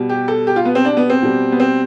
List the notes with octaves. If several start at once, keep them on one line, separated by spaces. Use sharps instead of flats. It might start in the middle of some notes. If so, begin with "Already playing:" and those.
Already playing: B2 G3
G4
A4
G4
F4
B3
C4
D4
B3
C4
B2 G3
B3
C4